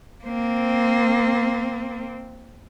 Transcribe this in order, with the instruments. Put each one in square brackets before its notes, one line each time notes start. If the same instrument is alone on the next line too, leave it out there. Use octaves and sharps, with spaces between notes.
[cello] A#3 C4